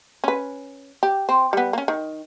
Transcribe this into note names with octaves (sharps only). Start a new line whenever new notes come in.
C#4 B4
G4
C4
G3 B3
A#3 C#4
D#3